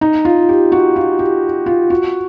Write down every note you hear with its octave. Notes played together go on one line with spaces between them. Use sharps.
D#4
F4
G4
F#4
F4
G4
F4
F#4